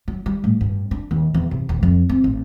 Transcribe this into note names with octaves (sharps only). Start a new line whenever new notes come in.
F#3
G3
A2
G2
D4
D#2
E2
C3
D#1
F2
C4
A1